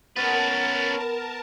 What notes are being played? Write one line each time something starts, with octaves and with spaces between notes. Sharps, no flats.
B3 C#4 A#4 B4 A5 A6